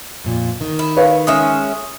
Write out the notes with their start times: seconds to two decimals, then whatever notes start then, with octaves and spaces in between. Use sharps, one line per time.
0.25 F2 A#2
0.61 D#3
0.79 E4
0.97 B4 C#5 F5
1.27 G#3 C#4 E5 D#6